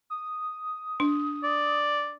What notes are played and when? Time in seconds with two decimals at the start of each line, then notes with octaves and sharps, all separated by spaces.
0.10 D#6
1.00 D4
1.44 D5